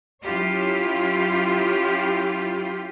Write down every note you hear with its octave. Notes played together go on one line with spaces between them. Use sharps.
F#3 C#4 E4 F4 G4